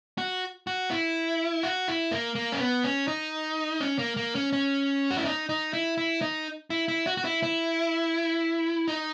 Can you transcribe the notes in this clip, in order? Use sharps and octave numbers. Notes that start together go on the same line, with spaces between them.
F#4
F#4
E4
F#4
E4
A#3
A#3
C#4
B3
C#4
D#4
C#4
A#3
A#3
C#4
C#4
F#4
E4
D#4
D#4
E4
E4
D#4
E4
E4
F#4
F#4
E4
E4
D#4